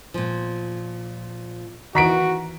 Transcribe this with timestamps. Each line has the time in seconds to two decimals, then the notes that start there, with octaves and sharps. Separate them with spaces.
0.14 A#2 F3
1.95 D#3 E3 F#4 A#5 B6 D7